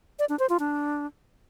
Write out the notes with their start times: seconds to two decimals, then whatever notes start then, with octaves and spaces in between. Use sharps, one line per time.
0.19 D5
0.29 D4
0.39 C5
0.49 F4
0.60 D4